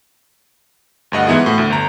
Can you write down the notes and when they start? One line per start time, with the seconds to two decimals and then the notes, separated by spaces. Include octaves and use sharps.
1.12 D2 G2 D#5 F#5
1.27 G#2 E3 B3 E4 G#4
1.45 A2 F#4
1.58 D2
1.70 G1 A#5